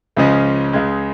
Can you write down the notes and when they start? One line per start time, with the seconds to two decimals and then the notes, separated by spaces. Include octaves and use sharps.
0.17 C#2 C#3 F3 G#3 C#4
0.73 C#2 C#3 G#3